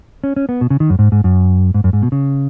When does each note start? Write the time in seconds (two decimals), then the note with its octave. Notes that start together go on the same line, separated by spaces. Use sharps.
0.24 C#4
0.36 C#4
0.49 B3
0.61 B2
0.70 C#3
0.80 D#3
0.90 F#2
0.99 G#2
1.12 G#2
1.24 F#2
1.74 G#2
1.84 F#2
1.93 G#2
2.03 B2
2.12 C#3